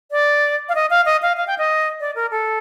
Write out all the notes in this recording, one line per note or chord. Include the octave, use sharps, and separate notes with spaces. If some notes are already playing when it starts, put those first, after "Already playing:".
D5
F5
D#5
F5
D#5
F5
F5
G5
D#5
D5
A#4
A4